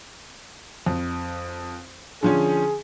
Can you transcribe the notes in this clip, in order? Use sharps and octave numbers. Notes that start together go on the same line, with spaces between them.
F2
D3 F3 C#4 G#4